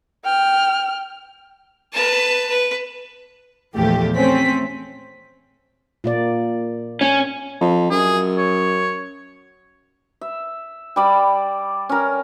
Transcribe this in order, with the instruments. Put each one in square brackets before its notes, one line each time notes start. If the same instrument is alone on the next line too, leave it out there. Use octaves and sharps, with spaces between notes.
[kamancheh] G5 F6
[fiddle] B4 A5
B4
[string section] A#1 E2 F3 A3 G4
A3 C4 C#4 B6
[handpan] A#2 A#3 D5
[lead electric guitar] C#4
[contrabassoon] F2
[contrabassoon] F#2 [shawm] G#4
[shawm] C#5
[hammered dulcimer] E5
G3 D5 B5
C#4 A#4